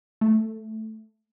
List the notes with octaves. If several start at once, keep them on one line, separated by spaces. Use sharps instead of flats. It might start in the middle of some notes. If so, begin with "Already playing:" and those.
A3